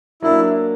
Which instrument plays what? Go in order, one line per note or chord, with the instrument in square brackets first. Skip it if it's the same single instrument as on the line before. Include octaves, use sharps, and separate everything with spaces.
[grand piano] F#3 A#3 D4 [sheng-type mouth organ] E4